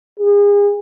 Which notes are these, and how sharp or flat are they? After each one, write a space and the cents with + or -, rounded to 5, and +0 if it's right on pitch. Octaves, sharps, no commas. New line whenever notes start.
G#4 -35